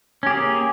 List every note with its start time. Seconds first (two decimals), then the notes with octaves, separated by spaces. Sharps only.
0.23 C#4
0.27 G4
0.30 G#4
0.34 A#3